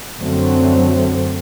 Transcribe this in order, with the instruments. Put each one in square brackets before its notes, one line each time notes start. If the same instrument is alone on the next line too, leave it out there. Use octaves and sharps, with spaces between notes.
[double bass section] F#2 D3 F#3 A3 C4